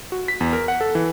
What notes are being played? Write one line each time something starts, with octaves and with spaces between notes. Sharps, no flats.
F#4
B6
E2
A#4
F#5
A4
E3